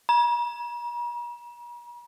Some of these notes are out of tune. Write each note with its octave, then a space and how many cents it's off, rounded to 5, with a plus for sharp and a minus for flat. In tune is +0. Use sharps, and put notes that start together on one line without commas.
A#5 +45